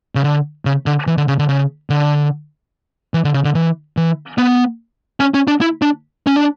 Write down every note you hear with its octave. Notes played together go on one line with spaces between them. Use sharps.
C#3
D3
C#3
D3
E3
D3
C#3
D3
C#3
D3
E3
D3
C#3
D3
E3
E3
B3
C#4
C#4
D4
E4
D4
C#4
D4